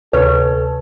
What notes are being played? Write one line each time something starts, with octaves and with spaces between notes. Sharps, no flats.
D2 C3 A4 B4 C#5